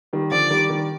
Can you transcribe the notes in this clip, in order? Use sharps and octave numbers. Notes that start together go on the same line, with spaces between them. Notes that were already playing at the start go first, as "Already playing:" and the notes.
D#3 G3
D3 F3 D5
D#3 G3
D#3 G3